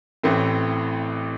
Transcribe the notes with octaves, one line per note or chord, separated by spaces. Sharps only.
A1 A2 E3 A3 C4